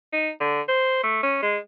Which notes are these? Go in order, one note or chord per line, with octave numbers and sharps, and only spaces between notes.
D#4
D3
C5
A3
C#4
G#3